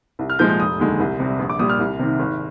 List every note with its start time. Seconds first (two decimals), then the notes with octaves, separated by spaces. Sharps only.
0.19 C2
0.30 F6
0.39 A#2 F3 G#3 G6
0.49 G6
0.59 F1 D#6
0.79 D#2 D3 G#3
1.00 C2
1.19 C3 G3
1.39 A#1
1.49 D6
1.59 A#2 G3 D#6
1.69 F6
1.79 C2
1.99 C3 D#3
2.19 G#1